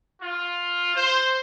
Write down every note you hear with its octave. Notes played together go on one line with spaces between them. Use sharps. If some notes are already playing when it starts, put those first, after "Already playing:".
F4
C5